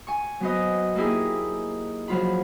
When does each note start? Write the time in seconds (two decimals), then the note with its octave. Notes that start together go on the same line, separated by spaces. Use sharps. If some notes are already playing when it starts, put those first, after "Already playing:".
0.07 G#5 C#6
0.40 F#3 B3 C5 D#5
0.95 A#3 D#4 E4 G4 G#4
2.08 F3 F#3 F4 B5